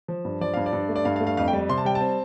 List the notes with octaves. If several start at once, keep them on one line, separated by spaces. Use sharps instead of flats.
F3
G2
F3 D5
G2 F5
D5
G2
A3
D5
G2 F5
F5
A3
F5
F2 F5
G5
G3
C3 C6
A5
G3 G5
A5
C4